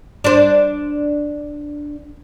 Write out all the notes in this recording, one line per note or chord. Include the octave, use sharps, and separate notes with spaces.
D4 C5